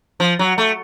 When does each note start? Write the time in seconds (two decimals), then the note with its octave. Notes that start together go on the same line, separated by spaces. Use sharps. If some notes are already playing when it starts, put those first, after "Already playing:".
0.20 F3
0.39 F#3
0.58 A3